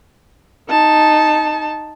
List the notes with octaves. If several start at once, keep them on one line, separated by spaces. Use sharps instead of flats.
D#4 A5